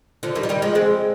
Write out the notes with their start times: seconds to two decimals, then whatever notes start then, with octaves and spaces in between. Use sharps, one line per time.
0.23 D3 F3
0.35 D#3 G3
0.43 F3
0.49 D#3 G3
0.62 F3 G#3
0.75 G#3 C4